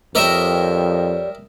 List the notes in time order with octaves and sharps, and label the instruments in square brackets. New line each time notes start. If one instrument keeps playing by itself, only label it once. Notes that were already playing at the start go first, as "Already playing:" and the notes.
[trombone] F2 [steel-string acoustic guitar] G3 C#5 [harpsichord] A#4 D#5 E5